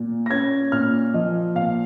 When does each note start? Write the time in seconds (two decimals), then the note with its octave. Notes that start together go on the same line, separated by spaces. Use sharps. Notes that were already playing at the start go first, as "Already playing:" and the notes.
Already playing: A#2
0.26 A#6
0.30 C#4 G#6
0.72 A#2 F6
1.14 F3 D#5
1.55 A#2 F5